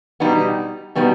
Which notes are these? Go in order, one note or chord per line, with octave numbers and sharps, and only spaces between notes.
B2 G3 B3 D#4
B2 G3 B3 D#4